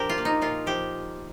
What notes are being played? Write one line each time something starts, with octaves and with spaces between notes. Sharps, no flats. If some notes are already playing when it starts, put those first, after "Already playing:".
Already playing: F3 D4 G4 A#4
F4
A#3
D#4
A#2 F4
F3 G4